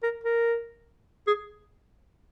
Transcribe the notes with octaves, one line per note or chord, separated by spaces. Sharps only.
A#4
A#4
G#4